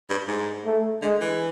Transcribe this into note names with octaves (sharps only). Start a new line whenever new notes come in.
G2
G#2
A3
D3 G#3
E3